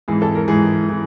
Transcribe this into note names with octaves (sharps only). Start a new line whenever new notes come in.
G#2 E3 G#4
A4
A#4
G#2 E3 G#4
E3